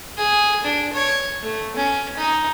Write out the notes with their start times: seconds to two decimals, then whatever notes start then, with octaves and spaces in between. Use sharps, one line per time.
0.17 G#4
0.64 D4
0.93 C#5
1.42 A3
1.76 C#4
2.16 D#4